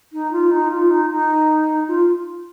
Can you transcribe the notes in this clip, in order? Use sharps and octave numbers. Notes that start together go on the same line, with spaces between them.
D#4
F4
D#4
F4
D#4
D#4
F4